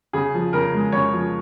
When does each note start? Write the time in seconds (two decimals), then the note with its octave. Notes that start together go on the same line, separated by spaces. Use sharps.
0.13 C#3 G#4
0.34 F3
0.53 C#3 A#4
0.74 G#3
0.92 C#3 C#5
1.13 F3